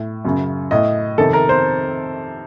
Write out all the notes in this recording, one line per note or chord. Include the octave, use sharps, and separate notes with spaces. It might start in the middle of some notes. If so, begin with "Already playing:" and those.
Already playing: A2
F#2 C#3
A2 D#5
F2 C3 D#3 A4
A#4
C5